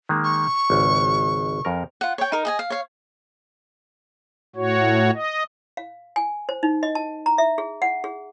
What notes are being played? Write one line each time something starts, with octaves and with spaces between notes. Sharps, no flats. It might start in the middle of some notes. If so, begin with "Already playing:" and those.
D#3 G#3 A#3
C#6
G#1 C#2
F2 A#4
F4 F#5
C#5 G5
D#4 A#4
G#4 D#5 G#5
F5
C#5 F5
A2 F#4 C#5
D#5
F5
G#5
C5
D#4
D#5
A5
A#5
E5
G#4
F#5
G#4